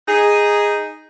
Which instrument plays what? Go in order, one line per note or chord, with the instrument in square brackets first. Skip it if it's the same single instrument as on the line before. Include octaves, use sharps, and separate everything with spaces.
[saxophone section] D#4 G#4